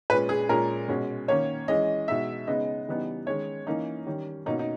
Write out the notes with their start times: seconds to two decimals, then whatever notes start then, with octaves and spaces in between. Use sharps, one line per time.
0.10 A#2 G#3 C#4 B4
0.29 G#4
0.49 A#2 G#3 C#4 A#4
0.88 B2 G#3 C#4
1.28 D#3 A#3 C#4 C#5
1.68 E3 G#3 C#4 D#5
2.08 B2 G#3 D#4 E5
2.47 C#3 G#3 B3 D#4 D#5
2.88 C#3 E3 G3 B3 D#4
3.26 D#3 G#3 C#4 C#5
3.66 E3 A#3 C#4 D#4
4.07 D#3 G3 C#4
4.46 B2 A#3 C#4 D#4
4.59 D#4